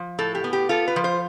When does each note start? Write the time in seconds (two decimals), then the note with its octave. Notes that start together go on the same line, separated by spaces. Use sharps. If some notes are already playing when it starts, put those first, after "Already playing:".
Already playing: F3
0.19 A2 A4
0.35 G4
0.44 B3
0.53 G4
0.69 F4 A4
0.88 B4
0.96 F3
1.04 C5